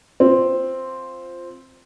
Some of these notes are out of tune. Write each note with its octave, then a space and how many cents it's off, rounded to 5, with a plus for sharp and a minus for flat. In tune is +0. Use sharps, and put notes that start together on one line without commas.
C4 +0 F4 +0